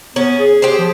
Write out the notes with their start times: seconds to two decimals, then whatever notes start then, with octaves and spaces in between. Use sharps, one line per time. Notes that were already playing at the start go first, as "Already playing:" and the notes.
0.16 B3 C#4
0.39 G#4
0.62 G4 C5
0.79 F3